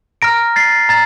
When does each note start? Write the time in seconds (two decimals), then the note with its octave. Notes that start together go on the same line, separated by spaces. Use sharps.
0.22 A#5 F6 A#6 D7
0.56 A6 C7
0.89 A#5 A6